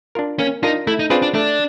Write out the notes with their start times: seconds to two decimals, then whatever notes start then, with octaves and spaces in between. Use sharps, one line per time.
0.15 D4 F4 A#4
0.39 A#3 C#4
0.63 D4 D#4 F4 A#4
0.87 A3 E4
0.99 D#4
1.10 C4 D4 F4 G#4 B4
1.22 D4
1.34 A3 D4